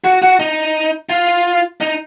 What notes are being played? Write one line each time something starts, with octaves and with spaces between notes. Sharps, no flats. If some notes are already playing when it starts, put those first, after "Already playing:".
F#4
F#4
D#4
F4
D#4